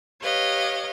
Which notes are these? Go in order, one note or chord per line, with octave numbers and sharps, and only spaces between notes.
G4 B4 C#5 D#5 F5